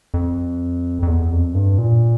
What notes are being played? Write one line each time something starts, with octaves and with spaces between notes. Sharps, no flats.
F2
F2
E2
F2
G2
A#2